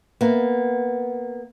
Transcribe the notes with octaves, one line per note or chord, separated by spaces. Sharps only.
A#3 B3